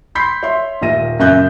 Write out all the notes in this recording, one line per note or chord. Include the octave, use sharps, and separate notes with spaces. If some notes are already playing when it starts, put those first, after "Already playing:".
B5 C6 G6 B6 C7
C#5 E5 C6
D#1 A#2 E5 A#6 D#7
F#2 C#3 E5 F#6 G6